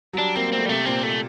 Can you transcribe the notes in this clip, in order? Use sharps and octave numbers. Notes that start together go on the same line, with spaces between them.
F#3
G3 D4
A#3 C4
A#3
C4
A3
G3
C3 A3
A#2 C4
A3